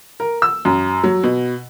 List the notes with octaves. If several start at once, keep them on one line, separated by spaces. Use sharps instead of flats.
A#4
E6
F#2
F#3
B2